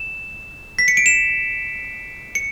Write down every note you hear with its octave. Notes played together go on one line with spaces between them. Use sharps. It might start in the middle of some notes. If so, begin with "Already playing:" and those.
Already playing: E7
B6
C#7
D7
E7
C#7